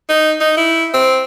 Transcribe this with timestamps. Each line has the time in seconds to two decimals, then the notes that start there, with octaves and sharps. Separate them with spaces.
0.09 D#4
0.40 D#4
0.57 E4
0.94 C4